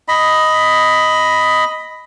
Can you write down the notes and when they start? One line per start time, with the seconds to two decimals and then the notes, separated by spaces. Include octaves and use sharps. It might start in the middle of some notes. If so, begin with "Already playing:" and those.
0.08 D#5 B5